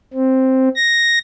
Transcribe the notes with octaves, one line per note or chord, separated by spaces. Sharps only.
C4
A#6